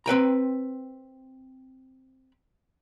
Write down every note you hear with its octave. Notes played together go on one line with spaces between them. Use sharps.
C4 B4 G5 A#5